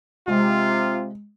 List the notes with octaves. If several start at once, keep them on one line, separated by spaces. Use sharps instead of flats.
C3 G#3 F4